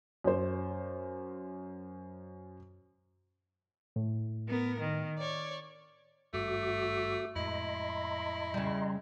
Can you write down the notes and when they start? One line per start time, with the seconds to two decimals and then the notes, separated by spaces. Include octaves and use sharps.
0.24 F#2 C5
3.96 A2
4.48 B3 A#4
4.80 D#3
5.19 C#5 D5
6.34 G#1 G2 A3 F#4 D6
7.36 F2 A2 G#3 E4 D#5 A#5 C6
8.54 C#3 G3